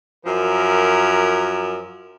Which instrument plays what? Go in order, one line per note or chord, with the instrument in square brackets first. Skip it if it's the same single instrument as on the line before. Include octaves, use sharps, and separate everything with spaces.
[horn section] F#2 F3 A#4